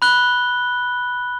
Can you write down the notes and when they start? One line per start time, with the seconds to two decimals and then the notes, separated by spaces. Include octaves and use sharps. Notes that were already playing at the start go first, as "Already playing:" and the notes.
0.02 B5 F#6 G7